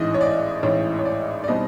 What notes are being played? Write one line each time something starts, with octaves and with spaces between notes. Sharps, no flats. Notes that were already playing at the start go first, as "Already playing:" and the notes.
Already playing: A1 G#2 E3 D#5
C#5
D5
A1 G#2 E3 C#5
C#5
D5
D5
B2 G3 C4 D#4 D#5